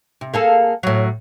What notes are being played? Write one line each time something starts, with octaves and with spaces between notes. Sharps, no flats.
C3
A#3 G#4 A4
A2 F#3